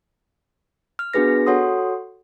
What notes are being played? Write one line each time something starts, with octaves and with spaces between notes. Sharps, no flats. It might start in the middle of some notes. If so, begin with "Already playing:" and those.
F6
B3 D4 F#4 G#4 B4 A#6
F#4 A4 C#5 F#5 C6 D#6